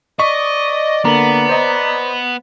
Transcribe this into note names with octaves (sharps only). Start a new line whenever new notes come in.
D5 D#5 C#6 B6
D3 A#3 B3 A#5
C5 D#5